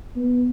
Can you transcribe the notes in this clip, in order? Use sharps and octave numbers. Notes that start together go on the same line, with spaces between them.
B3